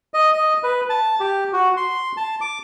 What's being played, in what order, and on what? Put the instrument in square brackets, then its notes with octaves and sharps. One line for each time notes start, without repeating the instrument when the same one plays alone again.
[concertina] D#5
D#5
B4
A5
G4
F#4
C6
A5
D6